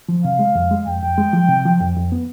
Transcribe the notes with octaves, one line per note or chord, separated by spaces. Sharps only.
F3
C3 F5
G#3
F2
G#3
F2 G5
F2
G#3
F3
C3
F3
F2
F2
B3